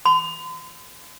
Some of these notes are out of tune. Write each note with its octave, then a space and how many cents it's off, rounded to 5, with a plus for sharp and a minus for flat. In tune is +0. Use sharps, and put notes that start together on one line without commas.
C6 -45